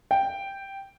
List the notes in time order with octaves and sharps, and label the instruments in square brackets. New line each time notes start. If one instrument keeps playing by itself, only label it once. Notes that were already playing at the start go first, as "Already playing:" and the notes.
[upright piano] G5